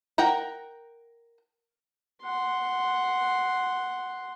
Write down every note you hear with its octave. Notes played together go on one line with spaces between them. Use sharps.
A#4 F#5 G5 A#5
F#5 C6